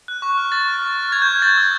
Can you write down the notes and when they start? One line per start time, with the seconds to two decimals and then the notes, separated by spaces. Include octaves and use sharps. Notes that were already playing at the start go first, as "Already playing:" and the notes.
0.08 F#6
0.22 C#6
0.37 F6
0.52 C#6 A6
0.68 F6
0.82 C#6
0.97 F6
1.12 C#6 G#6
1.22 G6
1.26 F6
1.42 C#6 A6
1.57 E6 G6